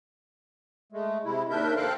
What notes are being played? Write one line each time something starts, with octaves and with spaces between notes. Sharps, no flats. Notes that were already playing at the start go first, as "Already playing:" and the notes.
G#3 A3
C3 G#3 E4
D#2 D#3 D4 A#4 E5 G6
A4 A#4 C5 F5 G5 F#6